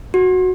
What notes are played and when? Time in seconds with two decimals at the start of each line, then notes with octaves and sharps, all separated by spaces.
0.14 F#4